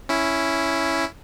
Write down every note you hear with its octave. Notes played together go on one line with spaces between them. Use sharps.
C#4 E4